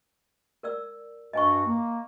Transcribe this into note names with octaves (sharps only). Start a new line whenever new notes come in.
A#4 D5 E6
G2 F#4 D#5 G#5 C#6
A#3